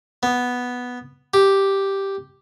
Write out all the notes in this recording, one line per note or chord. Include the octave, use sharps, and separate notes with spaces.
B3
G4